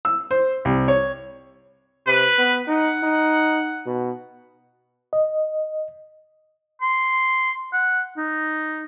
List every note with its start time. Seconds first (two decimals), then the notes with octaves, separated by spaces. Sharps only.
0.05 E6
0.31 C5
0.65 C2
0.88 C#5
2.07 C3 B4
2.38 B3
2.68 D#4 F#5
3.03 D#4
3.86 B2
5.13 D#5
6.82 C6
7.73 F#5
8.17 D#4